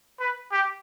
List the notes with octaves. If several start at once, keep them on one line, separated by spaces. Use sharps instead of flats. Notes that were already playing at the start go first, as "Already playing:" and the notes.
B4
G4